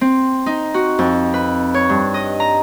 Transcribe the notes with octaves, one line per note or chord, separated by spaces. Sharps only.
C4
D#4
F#4
F2
B4
C#5
G2
D#5
A#5